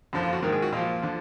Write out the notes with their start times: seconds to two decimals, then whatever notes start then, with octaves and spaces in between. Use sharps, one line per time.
0.13 F#2 D3 F3
0.23 F4
0.33 F#4
0.42 G#2 D#3 A#4
0.52 G#4
0.62 F#4
0.72 A#2 F3 F4
1.02 D3 F3